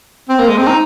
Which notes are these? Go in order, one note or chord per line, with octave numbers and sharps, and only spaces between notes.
C4
A#3
G#3
C4
D#4